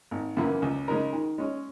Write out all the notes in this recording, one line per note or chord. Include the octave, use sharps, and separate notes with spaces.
G#1
F#2 C#3 E3 A#3
C#2
C#3 G#3 D#4 A#4
D#3
G#3 C#4